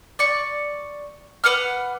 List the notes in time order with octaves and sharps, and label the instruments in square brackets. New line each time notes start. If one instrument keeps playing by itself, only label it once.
[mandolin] D5 C#6
B4 F#5 D6 F6